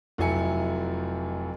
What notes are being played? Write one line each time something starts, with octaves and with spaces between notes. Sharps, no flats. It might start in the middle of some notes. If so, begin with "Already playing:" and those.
F1 F2 F#3 E4 G#5 C#7